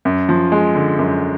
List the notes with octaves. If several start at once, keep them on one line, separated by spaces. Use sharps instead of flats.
F#2
F3
G#3
D3
F#2